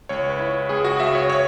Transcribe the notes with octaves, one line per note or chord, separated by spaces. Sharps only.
C#2 C#5
B4
E4
C#2 G#4
F#4
C#2 E5
C#5
C#5